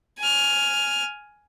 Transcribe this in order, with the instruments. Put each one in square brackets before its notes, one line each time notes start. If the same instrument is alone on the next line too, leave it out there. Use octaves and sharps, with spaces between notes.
[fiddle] G#5 F6